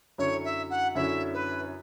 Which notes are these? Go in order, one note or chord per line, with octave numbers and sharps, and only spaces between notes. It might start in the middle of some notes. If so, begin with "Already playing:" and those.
F#2 D3 F#3 C#4 E4 C#5
E5
F#5
F#2 D3 F#3 C#4 E4 E5
B4